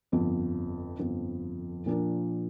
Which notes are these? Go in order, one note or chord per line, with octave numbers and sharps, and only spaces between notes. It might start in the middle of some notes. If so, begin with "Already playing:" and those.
G1 F2 F3
G1 F2 F3
A#2 F3 D4 A#4